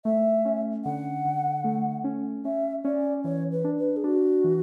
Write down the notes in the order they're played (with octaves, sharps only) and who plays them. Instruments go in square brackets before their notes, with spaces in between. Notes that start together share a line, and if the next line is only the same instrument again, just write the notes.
[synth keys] A3 [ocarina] E5
[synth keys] C#4
[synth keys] D3 [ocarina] F#5
[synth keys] D3
A3
C#4
[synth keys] C#4 [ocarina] E5
[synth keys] C#4 [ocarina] D5
[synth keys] E3 [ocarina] C#5
[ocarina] B4
[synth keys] D4
[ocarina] B4
G#4
[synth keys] D4 [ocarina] F#4
[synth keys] E3